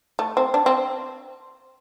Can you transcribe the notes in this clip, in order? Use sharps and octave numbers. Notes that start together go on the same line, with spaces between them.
A3
C4
D4
C4